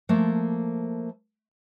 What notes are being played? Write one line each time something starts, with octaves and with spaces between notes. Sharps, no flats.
F3 A3 A#3